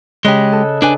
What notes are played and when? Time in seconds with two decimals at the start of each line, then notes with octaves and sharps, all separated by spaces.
0.25 C#3 G#3 G4 D#5 F#6
0.52 A4
0.82 D4 B4 G#5